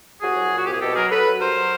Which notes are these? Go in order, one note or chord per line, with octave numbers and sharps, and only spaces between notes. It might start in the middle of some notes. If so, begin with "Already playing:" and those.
C2 F#4 G#4
F#3
A#2
F#4
C2 G4
G#4
B2 G4 A4
F#3 G#4 A#4
F#3 A4 B4
F#3
G2 A#4 C5
F#3